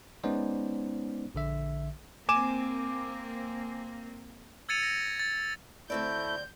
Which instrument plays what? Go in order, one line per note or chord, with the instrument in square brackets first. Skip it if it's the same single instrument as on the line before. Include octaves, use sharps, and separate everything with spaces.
[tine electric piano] G#3 B3 C#4 D#4 C5 D5
A#1 D3 E5
[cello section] A#3 C4 [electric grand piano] G#5 D6 E7
[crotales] E6 G#6 A6 C#7 D#7 F7
A#6
A6
[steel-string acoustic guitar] D2 C4 D5 [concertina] A3 E4 [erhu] G6